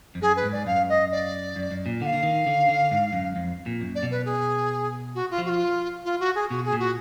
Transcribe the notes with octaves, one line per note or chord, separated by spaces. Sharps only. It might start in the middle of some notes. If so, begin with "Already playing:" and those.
F2
F#2 G#4
B4
G#2
D5
F#2 F5
D#5
D5
F#2
F#2
A#2
D3 F#5
F5
D3
D#3
D3
D3
G#2
F#2
F2
A#2
F#2
D5
B2
B4
G#4
F#4
F4
F3
F#4
F4
F4
F#4
G#4
B2 F#4
G#4
A#2
F#4